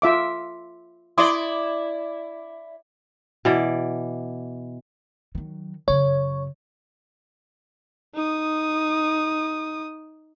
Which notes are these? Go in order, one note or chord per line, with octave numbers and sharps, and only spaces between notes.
F4 E5 D6
E4 D5 C6 D6 D#6
B2 E3 D5
D#3 F#3
F#2 C#3 C#5
D#4 D#6